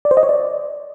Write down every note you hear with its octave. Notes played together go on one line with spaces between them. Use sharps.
D5
C5
D#5
C#5
D5